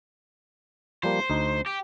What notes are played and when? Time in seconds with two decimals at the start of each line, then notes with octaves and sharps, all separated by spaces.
1.03 F3 G3 A#3 C5
1.30 D2 D#4
1.67 G4